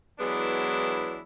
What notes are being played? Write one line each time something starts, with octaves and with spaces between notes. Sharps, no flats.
E3 F#3 G#3 B3 D4 E4